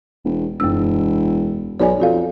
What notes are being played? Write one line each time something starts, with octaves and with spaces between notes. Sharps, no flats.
E1
E1 F#2 E6
B1 C#5 D5 G#5
F2 F#4 A4 F5